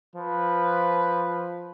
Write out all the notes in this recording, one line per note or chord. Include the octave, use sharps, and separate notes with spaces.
F3 B4